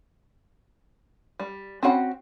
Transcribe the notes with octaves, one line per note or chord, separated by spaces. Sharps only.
G3
C4 C#4 F#4 F#5 B5